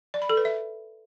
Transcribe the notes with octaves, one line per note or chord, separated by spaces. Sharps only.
D5
B5
A4
B4
E5